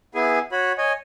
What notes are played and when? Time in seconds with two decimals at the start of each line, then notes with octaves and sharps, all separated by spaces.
0.15 B3 E4 G#4 G#5
0.52 F#4 C#5 B5
0.78 C#5 D#5 G#5